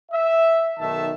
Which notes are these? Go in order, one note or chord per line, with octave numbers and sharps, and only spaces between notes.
E5
B1 D#3 A3 E5 A5